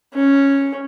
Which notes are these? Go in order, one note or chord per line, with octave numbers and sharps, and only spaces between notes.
C#4